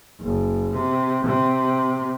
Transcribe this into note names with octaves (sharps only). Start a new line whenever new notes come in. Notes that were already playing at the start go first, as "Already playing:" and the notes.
F#1
C3
C3